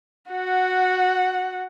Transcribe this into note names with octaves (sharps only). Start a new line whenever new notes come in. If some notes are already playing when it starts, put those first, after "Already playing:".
F#4 F#5